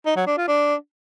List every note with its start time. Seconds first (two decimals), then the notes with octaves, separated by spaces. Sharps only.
0.06 D#4
0.17 F#3
0.27 D4
0.38 F4
0.48 D4